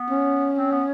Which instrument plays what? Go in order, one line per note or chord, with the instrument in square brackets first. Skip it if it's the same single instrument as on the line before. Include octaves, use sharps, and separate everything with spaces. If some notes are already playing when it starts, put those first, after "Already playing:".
Already playing: [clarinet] B3
[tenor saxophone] C#4
[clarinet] C4
B3